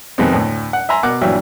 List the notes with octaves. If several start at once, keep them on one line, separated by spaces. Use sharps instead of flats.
F2 C3 D#3 G#3 B3 C4
D2 A2
F#5
E5 G#5 A#5 C6
B2 A#4 F#5 D6 F#6
G2 A#2 E3 F#3 E5 G5